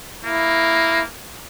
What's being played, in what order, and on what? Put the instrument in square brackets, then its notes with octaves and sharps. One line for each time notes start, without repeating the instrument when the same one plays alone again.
[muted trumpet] A#3 [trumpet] E4